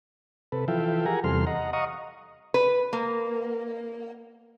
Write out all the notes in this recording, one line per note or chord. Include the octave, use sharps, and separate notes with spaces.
C3 A4 B4
E3 F3 A4 E5 F5 G5
G4 G#4 A#4 F#5 G#5 A#5
E2 C3 G3 A4 C6 F6
D#5 F#5 A#5
D#5 F5 F#5 A#5 C#6 D#6
B4
A#3